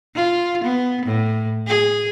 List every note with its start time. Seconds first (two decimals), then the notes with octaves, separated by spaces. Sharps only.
0.16 F4
0.64 B3
1.06 A2
1.68 G#4